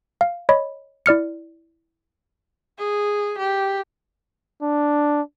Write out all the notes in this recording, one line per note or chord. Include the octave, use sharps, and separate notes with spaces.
F5
C#5 D#5 B5
E4 D5 F6 C#7
G#4
G4
D4